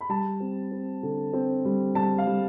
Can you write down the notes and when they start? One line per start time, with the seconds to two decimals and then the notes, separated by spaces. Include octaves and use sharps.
0.01 B5
0.09 G3 A5
0.40 C4
0.72 C4
1.03 D3
1.33 C4
1.65 G3
1.95 G3 A5
2.18 F5
2.27 G3